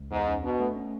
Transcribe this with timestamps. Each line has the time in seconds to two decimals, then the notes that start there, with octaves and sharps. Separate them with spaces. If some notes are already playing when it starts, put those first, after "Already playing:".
Already playing: C#2
0.11 E2 G#2
0.27 C#4
0.43 B2 D4
0.60 A3
0.76 C#4